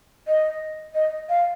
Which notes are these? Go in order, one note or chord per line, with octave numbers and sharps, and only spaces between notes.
D#5
D#5
F5